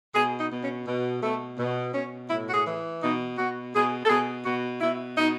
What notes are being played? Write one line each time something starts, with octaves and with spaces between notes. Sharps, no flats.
B2 G#4
D#4
B2
C#4
B2
B2 A3
B2
B2 C#4
A2 E4
F#4
G#4
E3
B2 D#4
B2 F#4
B2 G#4
A4
B2 G#4
B2 F#4
B2 E4
B2 D#4